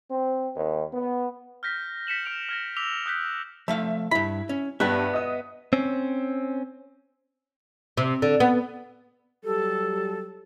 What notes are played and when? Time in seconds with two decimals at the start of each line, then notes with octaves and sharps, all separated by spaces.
0.11 C4
0.56 D#2
0.93 B3
1.63 F6 G6 A#6 B6
2.07 B6 C#7 E7 F#7
2.25 F6 D7 F7
2.49 F6 G#6 A#6
2.76 D6 E6 B6 F7 G7
3.06 D#6 F#6 G6 B6 F7
3.68 F3 A3 E5 F5
4.11 G2 E4 B5
4.49 C#4
4.80 G2 B3 G4 E5 F#6
5.14 D#5 D#6
5.73 C4 C#4
7.97 C3
8.22 D3
8.40 B3
9.44 F#3 G3 G4 A4